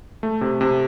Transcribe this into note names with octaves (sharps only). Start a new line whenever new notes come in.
A3
C3
C3